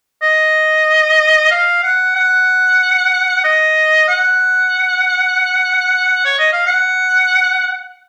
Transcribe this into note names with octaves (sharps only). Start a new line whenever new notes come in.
D#5
F5
F#5
F#5
D#5
F#5
C#5
D#5
F5
F#5